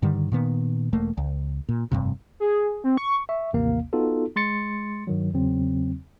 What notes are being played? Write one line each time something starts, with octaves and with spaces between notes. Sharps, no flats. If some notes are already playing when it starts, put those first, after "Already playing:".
G2 D3 D#3 G3
A#2 D#3 B3
E1 A3 A#3
C#2
A#2
F1 C#2 G2 C3
G#4
C4
C#6
E5 C#6
A1 D#2 C3 A#3 F5
B3 D#4 F4 F#4 A4
G#3 C6 A6 C#7
G2 D#3 F#3
E2 C#3 F#3 C4